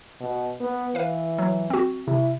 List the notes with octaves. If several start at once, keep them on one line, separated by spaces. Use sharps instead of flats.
B2
B3
E3 B4 F5
F#3
C4 F#4
C3 E4